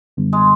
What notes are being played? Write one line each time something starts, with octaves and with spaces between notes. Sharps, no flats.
F#2 D3 G3 B3
G#3